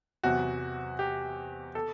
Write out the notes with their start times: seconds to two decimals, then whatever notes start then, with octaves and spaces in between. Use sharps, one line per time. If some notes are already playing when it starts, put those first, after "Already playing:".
0.23 E2 C3 F#3 F#4
0.99 G4
1.75 A4